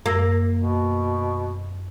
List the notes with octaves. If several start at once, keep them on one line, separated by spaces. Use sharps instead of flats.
F#2 A#3 E6 A#6
B2